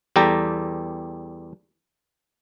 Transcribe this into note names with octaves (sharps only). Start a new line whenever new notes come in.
E2 G3 G4 A4 A#5